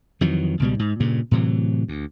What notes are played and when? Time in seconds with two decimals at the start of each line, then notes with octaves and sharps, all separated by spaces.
0.21 F2 D#3 E3 F#3
0.60 C#2 B2 G3
0.79 G#2
1.00 G2 A#2 C#3
1.31 A2 C3 E3 F#3
1.88 D2